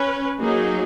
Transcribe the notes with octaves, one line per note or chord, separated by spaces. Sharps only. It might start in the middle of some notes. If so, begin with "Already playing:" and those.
Already playing: C#4 B4
F#3 A#3 D#4 G#4